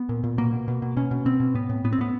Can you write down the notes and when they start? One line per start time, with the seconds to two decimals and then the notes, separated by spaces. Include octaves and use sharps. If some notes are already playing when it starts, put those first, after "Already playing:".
Already playing: B3
0.09 A#2
0.24 A#2
0.38 B2 A#3
0.53 B2
0.68 B2
0.82 B2
0.97 B2 C#4
1.11 B2
1.26 B2 C4
1.40 B2
1.54 A2 B3
1.69 A2
1.84 A2 B3
1.93 C4
1.98 A2 B3